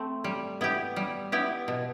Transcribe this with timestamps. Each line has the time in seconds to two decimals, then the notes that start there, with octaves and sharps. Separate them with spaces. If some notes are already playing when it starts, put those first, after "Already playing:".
Already playing: A3 C4
0.24 G3
0.61 B3 E4 G4
0.96 G3
1.32 B3 E4 G4
1.68 B2